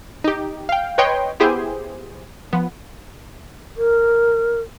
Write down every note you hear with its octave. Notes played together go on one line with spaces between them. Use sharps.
D#4 G4
F5 G5
B4 C#5 D#5 G5 C6
B3 E4 G4 G#4 C5
F3 B3
A#4